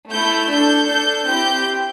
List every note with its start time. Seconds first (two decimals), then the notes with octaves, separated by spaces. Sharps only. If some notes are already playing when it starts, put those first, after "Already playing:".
0.10 A3 E4 A4 G6
0.48 D4 A4 G6
0.87 D4 A4 G6
1.25 C4 E4 G4 G6